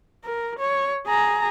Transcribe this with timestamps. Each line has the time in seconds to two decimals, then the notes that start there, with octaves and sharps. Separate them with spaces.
0.24 A#4
0.59 C#5
1.07 G#4 A#5